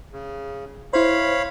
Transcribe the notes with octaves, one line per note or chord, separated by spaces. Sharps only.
C#3
E4 C5 C#5 F5 B5